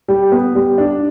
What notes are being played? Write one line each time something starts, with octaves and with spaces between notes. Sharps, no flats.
G3
B3
G3
D4